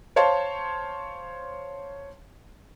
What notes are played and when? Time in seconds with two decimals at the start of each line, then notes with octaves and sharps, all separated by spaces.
0.16 C5 C#5 F5 A5 C6